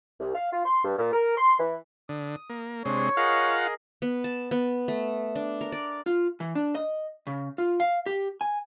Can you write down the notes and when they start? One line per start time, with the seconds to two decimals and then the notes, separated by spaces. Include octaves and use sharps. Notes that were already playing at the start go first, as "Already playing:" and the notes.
0.20 C2
0.34 F5
0.52 F4
0.65 C6
0.84 G2
0.98 A#2
1.13 A#4
1.38 C6
1.60 E3
2.09 D3 D#6
2.49 A#3
2.85 C3 G#3 D4 C#5 C6
3.17 F4 G#4 A#4 D#5 F5 F#5
4.02 B3
4.24 A5
4.51 B3
4.88 A3
5.36 D4
5.61 A#4
5.72 D5
6.06 F4
6.40 E3
6.55 D4
6.75 D#5
7.27 C#3
7.58 F4
7.80 F5
8.06 G4
8.41 G#5